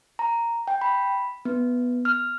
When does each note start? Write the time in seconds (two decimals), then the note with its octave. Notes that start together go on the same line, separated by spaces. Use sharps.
0.19 A#5
0.68 G5
0.81 B5
1.45 B3
2.05 F6